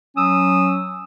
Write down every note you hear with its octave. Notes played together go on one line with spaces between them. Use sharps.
F#3 C#4 D#6 E6